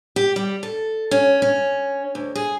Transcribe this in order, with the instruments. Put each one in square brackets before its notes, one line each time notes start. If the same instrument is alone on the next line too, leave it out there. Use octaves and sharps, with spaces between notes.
[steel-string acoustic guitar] G4
G3
A4
C#4
C#4
D2
G#4